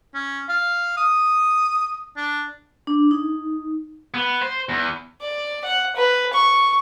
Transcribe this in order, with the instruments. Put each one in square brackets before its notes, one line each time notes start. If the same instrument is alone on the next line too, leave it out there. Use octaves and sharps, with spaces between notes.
[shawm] C#4
F5
D#6
D4
[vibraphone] D4
D#4
[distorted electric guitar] B3
C5
E2
[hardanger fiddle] D5
F#5
B4
C#6